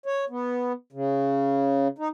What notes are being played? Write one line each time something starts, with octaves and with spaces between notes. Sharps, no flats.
C#5
B3
C#3
D#4